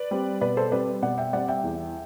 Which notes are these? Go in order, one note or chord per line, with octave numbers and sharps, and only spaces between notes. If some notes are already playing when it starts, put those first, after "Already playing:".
Already playing: B4 D5
G3 C4
B2 B4 D5
A4 C5
G3 C4 B4 D5
B2 D5 F#5
E5 G5
G3 C4 D5 F#5
E5 G5
E2